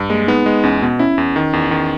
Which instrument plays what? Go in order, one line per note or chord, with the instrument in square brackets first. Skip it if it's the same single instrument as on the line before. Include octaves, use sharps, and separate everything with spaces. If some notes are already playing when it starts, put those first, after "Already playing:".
Already playing: [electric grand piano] G2
[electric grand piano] G#3 [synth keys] A#3
[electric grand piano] B3 [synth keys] D#4
[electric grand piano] G#3
[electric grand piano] E2 [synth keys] C#4
[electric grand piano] B2 [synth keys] B3
[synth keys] C#4 [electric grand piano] E4
[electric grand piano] E2
D#3
E2
D#3